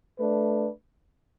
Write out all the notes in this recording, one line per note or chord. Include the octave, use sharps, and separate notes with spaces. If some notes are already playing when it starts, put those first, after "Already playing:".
A3 D4 B4